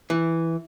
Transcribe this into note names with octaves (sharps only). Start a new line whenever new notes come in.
E3